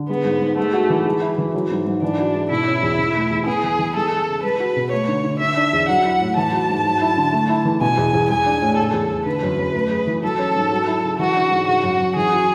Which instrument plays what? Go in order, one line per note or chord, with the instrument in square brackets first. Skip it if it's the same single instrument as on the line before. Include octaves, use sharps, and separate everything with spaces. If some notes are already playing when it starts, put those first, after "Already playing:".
Already playing: [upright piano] D3
[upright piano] G#3 [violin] B3
[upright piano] G#2
G#2
[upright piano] G#3 [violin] A3
[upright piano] F#4
E3
G#3
E4
E3
F#3
G#2
G#2
[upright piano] E3 [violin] D4
[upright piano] F#4
G#2
[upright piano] B2 [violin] E4
[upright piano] C#4
E2
B2
A3
E2
[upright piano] B3 [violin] G#4
[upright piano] E3
E3
[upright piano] G#3 [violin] A4
[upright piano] G#4
C#3
[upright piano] G#3 [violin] B4
[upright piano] F#4
B2
[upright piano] A3 [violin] C#5
[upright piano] D3
D3
[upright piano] D3 [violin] E5
[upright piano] D4
E2
[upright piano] F#3 [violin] F#5
[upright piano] E4
A2
[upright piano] E3 [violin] A5
[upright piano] F#4
G#2
F#3
E4
D3
A3
E4
E3
[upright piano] B2 [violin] G#5
[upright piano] E2
E2
[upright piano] G#3 [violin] G#5
[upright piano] D4
A2
[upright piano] C#3 [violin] A4
[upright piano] E2
E2
[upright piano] D3 [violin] B4
[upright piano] F#2
F#2
A3
G#4
E3
[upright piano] F#3 [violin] A4
[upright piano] C#4
G#2
F#3
E4
C#3
[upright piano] E3 [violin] F#4
[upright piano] D4
G#2
[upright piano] C#3 [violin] F#4
[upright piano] F#2
F#2
[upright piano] E3 [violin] G#4
[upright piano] F#4